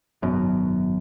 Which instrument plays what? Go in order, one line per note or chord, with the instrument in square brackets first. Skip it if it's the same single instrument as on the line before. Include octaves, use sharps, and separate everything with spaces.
[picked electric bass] G#1 F#2 B2